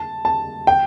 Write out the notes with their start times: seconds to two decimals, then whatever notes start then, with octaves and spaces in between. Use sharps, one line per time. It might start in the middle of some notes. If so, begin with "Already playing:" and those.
Already playing: A5
0.25 A5
0.67 G5